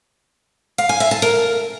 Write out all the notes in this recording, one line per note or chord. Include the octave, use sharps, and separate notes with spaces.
F5
G#5
E5
A5
A#4